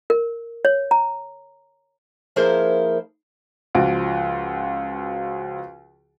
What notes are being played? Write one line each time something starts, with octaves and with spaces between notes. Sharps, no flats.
A#4
C#5
A#5
F3 A#3 E4 G#4 A#4 C5
C#2 F3 F#4 D7